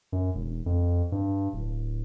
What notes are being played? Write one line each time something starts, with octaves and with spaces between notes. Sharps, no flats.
F#2
E1
F2
G2
D1